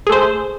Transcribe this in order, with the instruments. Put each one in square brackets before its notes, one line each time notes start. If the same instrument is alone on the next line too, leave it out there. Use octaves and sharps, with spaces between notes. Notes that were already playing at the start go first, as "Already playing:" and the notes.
[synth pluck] G#4
A3
C5